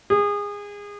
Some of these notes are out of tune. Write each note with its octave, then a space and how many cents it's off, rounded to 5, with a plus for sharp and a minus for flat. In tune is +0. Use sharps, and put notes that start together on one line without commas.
G#4 -25